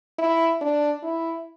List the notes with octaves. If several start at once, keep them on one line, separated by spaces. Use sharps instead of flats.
E4
D4
E4